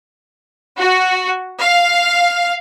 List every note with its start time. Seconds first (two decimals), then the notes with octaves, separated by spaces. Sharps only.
0.78 F#4
1.61 F5